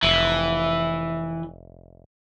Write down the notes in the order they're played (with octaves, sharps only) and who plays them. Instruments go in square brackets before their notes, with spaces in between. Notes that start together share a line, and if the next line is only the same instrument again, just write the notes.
[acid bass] F1 [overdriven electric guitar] E3